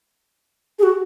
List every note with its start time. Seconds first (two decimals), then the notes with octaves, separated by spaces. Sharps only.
0.79 G#4
0.83 F#4